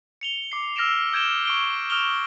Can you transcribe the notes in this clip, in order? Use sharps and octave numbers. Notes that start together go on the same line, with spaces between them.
C#7 F7 G7
D6 C7
E6 F6 A#6 C7 D7 E7
D#6 G6 G#6 D7 E7 G7
C#6 D7 G7
D#6 F6 D7 E7 F7 G7